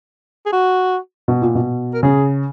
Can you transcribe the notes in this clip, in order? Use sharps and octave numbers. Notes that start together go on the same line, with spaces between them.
G#4
F#4
B2
A#2
B2
A#4
C#3 G#4